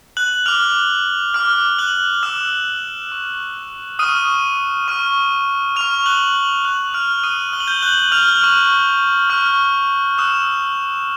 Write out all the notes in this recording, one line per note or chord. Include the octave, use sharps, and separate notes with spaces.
F#6 F#7
D6 F6 F7
D6 F6
F#6 F#7
D6 E6 F6 E7
C#6 F6
C#6 D#6 F6 D#7
C#6 F6
C#6 F6 F7
F#6 F#7
F#6 F#7
C#6 F6 F#6 F#7
F6 F7
D#6 D#7
C#6 F6 G7
F#7
G6 G7
F#6 F#7
F6 F7
C#6 F6
C#6 F6
D#6 E6 F#6 E7